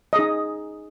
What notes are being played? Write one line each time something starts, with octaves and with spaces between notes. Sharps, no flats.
D#4 G#4 D#5